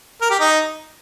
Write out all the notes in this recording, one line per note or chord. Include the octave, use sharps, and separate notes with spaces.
A#4
G4
D#4